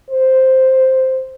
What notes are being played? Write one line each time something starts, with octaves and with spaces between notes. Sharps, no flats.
C5